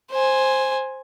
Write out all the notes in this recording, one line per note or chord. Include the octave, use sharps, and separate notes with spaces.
C5 G#5